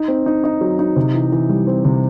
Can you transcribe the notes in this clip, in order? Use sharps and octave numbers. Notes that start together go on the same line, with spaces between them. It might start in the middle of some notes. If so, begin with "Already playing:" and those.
Already playing: D#4
C4
D#4
D#4
F#3
D#4
C3
E3
E3
G3
C4
C3